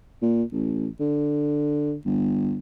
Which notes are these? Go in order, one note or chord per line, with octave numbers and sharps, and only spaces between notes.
A#2
A1
D3
G1